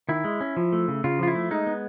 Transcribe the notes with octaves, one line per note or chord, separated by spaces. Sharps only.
D#3 E4
G#3
C#4
F3
A3
C#3
C#3 F4
F3 F4
E4
A3
G#3 D#4
B3